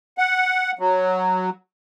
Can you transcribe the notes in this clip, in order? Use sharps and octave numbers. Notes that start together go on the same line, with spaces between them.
F#5
F#3